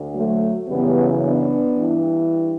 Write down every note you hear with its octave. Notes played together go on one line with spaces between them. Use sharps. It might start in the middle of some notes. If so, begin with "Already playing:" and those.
Already playing: D2 D3
F#3 A3
F#2 C#3 E3 G3 B3
B3 D4
G2 E3